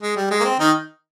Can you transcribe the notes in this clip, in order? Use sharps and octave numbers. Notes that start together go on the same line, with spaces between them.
G#3
G3
G#3
A#3
C4
D#3 D#4